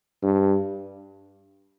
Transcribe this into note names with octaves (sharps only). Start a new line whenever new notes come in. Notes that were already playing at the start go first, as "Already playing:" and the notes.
G2